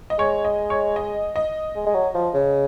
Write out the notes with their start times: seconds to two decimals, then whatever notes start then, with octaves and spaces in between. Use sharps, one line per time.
0.10 D#5
0.19 G#3 C#5
0.45 D#5
0.70 C#5
0.96 D#5
1.36 D#5
1.76 G#3
1.86 G#3
1.94 F#3
2.15 F3
2.34 C#3